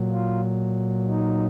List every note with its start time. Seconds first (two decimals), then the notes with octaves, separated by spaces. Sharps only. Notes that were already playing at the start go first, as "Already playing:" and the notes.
Already playing: A#2 F#3
0.11 F4
1.08 D#4